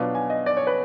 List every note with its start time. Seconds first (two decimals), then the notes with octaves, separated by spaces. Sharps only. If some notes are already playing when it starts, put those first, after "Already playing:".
Already playing: B2 F#3 B3 D4 F4
0.15 G#5
0.30 D#5
0.46 D5
0.57 C#5
0.67 B4